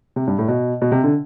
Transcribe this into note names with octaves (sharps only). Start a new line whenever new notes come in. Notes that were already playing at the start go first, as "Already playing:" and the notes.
C3
G2
A2
B2
B2
C3
D3